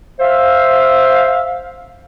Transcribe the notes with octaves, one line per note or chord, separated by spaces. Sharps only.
C5 E5 F5